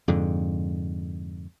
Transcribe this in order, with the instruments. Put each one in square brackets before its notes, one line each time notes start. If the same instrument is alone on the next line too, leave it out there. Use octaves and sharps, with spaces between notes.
[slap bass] F2 G#2 D3